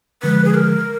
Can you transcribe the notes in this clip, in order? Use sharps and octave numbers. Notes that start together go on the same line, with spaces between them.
D3 F3 G#3 B4
G#4
A#4